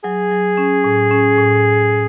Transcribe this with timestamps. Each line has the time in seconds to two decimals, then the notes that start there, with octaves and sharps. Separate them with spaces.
0.04 F#3 G#4
0.31 F#3
0.57 C#4
0.84 A2
1.11 C#4
1.38 A2